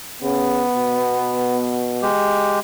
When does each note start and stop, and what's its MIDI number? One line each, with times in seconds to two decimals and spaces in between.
0.22 0.64 49
0.22 1.86 59
0.76 2.09 47
2.02 2.60 56
2.02 2.60 67